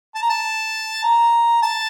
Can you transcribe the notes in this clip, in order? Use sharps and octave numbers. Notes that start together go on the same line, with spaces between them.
A5
A#5
A5
A#5
A5